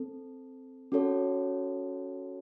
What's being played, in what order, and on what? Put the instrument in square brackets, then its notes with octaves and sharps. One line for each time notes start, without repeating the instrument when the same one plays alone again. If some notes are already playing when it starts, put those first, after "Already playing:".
Already playing: [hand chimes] C4 A4
C#4 F#4 A4 C#5